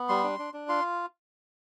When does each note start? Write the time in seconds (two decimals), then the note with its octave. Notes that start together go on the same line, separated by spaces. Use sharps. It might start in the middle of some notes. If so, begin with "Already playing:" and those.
Already playing: B3
0.09 G3 C6
0.23 D4
0.39 D4
0.54 D4
0.68 F4 C6